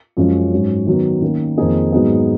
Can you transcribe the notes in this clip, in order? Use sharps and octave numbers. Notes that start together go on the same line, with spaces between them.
F#2 F3 G#3 C#4
G#2 F#3 C#4
D#3 F#3 B3
D#3 A#3 C#4
F2 D#3 A#3 D#4 G#4
G#2 F#3 B3 D#4 G#4